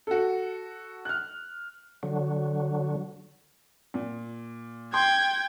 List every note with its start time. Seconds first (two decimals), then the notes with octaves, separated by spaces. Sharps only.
0.07 F#4 A4
1.05 F6 F#6
2.03 D3 F#3
3.94 A#2
4.94 G5 C6 G#6